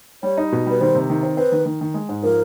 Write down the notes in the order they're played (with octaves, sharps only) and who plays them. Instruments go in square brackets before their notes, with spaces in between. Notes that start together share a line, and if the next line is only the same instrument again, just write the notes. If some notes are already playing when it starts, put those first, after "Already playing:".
[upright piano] G3 [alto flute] C#5
[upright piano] D#4
B2
[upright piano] G3 [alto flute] B4
[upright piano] D#3 [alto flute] C5
[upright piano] C3
D#3
C4
[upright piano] C4 [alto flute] B4
[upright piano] D#3
D#3
D#3
G#3
G#2
[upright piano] F3 [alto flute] A#4